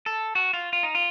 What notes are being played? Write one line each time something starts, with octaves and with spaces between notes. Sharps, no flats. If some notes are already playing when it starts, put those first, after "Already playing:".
A4
F#4
F4
F4
D#4
F4